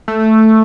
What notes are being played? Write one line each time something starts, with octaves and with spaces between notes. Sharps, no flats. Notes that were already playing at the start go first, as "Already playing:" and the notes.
A3